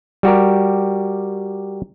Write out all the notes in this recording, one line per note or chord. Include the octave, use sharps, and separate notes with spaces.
G3 F#4 G4 A#4